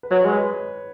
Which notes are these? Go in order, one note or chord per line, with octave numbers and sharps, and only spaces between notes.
B4
F#3 C#5
G#3 C#5
B4